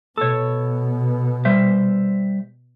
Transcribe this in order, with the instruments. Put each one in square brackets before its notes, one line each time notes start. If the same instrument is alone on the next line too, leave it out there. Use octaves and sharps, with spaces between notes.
[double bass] B2 B3 [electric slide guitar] A4 C#5
[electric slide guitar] G3 C5 E5